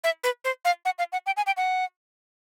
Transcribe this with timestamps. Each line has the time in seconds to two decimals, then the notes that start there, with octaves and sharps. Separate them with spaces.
0.04 E5
0.24 B4
0.44 C5
0.65 F5
0.85 F#5
0.99 F5
1.12 F#5
1.26 G5
1.37 G#5
1.46 G5
1.57 F#5